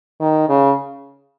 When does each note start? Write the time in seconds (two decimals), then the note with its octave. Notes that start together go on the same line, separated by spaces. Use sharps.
0.21 D#3
0.49 C#3